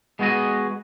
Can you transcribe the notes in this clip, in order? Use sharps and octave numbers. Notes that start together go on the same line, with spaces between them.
G#3 B3 F#4 G#4 D#5